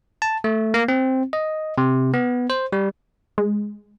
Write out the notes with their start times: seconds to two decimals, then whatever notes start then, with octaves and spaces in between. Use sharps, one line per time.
0.22 A5
0.44 A3
0.74 A#3
0.88 C4
1.33 D#5
1.78 C3
2.14 B3
2.50 C5
2.73 G3
3.38 G#3